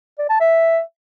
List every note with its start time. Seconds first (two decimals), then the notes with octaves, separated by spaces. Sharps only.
0.19 D5
0.30 A5
0.40 E5